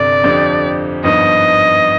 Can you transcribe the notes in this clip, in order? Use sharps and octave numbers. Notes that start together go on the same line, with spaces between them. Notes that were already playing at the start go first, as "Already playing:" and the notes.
Already playing: G1 C3 D5
F2 D3 F3 C4 G4
G#1 G2 F3 B3 D#4 D#5